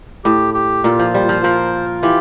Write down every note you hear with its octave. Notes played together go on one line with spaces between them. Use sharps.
A2 G4
G4
A#2 F4
F3
G3 C5
F3
F3 A#4
F4
E3 G4